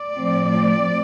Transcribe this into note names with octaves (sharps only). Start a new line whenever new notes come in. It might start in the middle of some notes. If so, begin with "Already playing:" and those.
Already playing: D5
A2 F3 C4